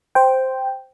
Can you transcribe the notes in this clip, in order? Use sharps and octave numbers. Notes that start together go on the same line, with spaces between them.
C5 G5